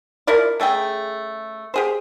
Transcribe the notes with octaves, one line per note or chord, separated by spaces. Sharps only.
F3 E4 A#4 D5
C#3 A3 G#4 G5
G4 G#4 C5